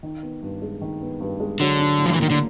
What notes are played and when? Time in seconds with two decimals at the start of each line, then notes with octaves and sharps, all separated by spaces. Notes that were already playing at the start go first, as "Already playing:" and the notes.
0.03 D#3
0.23 B3
0.42 G2
0.62 G#3
0.81 D#3
1.01 B3
1.21 G2
1.40 G#3
1.60 D3 F#3
1.79 D4
1.99 A2
2.06 F3
2.13 E3
2.18 D#3 A#3
2.30 D3